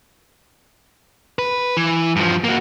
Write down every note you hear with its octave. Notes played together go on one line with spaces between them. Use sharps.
B4
E3
G2 F3
A#3 F#4